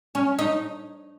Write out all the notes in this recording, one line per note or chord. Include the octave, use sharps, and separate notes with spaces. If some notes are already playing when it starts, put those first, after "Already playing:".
C#4
D#4